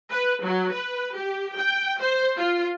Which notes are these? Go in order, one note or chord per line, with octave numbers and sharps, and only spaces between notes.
B4
F#3
B4
G4
G5
C5
F4